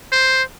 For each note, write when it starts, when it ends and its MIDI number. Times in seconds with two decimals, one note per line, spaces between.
0.12 0.43 72